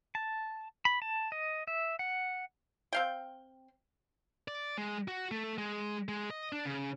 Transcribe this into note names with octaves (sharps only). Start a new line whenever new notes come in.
A5
B5
A5
D#5
E5
F#5
C4 F5 G5
D5
G#3
F#4
A3
G#3
G#3
D#5
D4
C#3